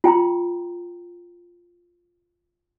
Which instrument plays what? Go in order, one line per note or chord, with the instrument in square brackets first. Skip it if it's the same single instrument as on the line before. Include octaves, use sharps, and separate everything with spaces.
[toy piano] F4 G5 A#5 C6